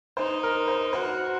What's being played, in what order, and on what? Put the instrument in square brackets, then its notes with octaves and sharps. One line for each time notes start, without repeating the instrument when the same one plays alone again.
[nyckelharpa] D#4 [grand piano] C5
[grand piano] A#4
C5
[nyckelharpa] F#4 [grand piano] C5